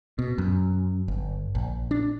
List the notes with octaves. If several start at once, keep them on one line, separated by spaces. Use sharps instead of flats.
B2
F#2
G1
A#1
D4